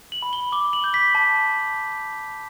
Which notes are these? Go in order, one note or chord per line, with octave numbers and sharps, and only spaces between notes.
F#7
B5
G7
D6 G7
F#7
G6
B6
A5